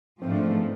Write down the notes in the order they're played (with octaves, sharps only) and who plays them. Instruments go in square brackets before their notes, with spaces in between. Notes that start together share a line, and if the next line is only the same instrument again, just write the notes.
[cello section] G#2 F3 A3 [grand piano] C4
[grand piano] D4
B3